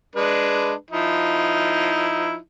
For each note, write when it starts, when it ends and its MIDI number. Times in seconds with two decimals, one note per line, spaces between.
0.16 0.73 56
0.16 0.73 62
0.16 0.73 71
0.91 2.36 53
0.91 2.36 63
0.91 2.36 64